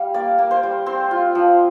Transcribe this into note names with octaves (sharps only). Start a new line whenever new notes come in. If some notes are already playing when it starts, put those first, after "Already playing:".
Already playing: G3 F5
A#3 D5
A#3
C5
G3
C4 C5
F4
F3